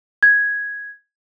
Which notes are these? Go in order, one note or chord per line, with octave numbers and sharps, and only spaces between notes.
G#6